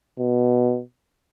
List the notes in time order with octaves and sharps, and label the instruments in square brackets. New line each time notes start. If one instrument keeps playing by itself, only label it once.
[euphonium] B2